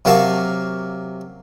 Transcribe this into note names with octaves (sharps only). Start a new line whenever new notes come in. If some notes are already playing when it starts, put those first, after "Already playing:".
C3 F#3 A#3 F5 A5 C#6